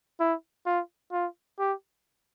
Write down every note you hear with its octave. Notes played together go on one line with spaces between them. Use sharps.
E4
F4
F4
G4